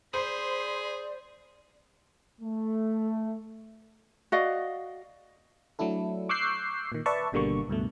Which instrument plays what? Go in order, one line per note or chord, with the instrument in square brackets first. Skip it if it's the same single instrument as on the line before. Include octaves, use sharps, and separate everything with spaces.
[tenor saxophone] G#4 [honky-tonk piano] C5 [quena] D5 [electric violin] B5 C6
[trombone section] A3
[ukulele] F#4 D5 D#5 F5
[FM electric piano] F#3 A3 D4 E4 A4
C#6 D6 E6 F#6 G6 C7
A#2 D#3
B4 D5 E5 A5 C#6
G#1 B2 D3 G3 A#3 C#6
C#2 G2 B2 A3